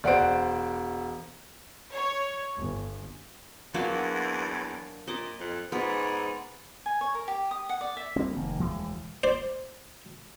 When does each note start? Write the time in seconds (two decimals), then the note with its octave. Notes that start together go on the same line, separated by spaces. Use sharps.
0.04 E1 C5 D5 F#5 D7
1.93 C#5
2.57 G1
3.74 E2 F#3 A#3 D4
5.07 A#2 D#5 D6
5.40 F2
5.72 G#2 B3
6.86 G#5
7.01 C#5
7.15 A#4
7.28 G4
7.51 D#6
7.69 F#5
7.81 D5
7.97 E5
8.16 G3 A#3 C4
8.36 F1 D#3 A#3
8.59 E1 D2 E3 G#3
9.24 C5 D5